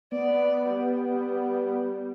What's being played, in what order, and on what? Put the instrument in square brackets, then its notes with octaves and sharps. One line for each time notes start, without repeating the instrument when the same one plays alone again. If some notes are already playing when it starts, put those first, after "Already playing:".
[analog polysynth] B3 [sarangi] D5
[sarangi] G3